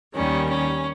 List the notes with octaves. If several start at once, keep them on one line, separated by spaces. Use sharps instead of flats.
D#2 D#3 G3 C#4
C#4